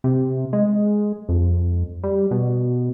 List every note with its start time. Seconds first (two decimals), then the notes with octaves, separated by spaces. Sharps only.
0.04 C3
0.53 G#3
1.29 F2
2.03 G3
2.31 B2